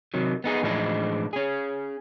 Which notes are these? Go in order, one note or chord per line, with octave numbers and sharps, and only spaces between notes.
C3 D#3 F#3
B3 D#4 G#4
A2 E3 F3 G#3 D4 D#4
C#4 G#4